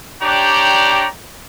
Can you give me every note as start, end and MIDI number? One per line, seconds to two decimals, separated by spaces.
0.21 1.05 62
0.21 1.05 67
0.21 1.05 73
0.21 1.05 74
0.21 1.05 79
0.21 1.05 82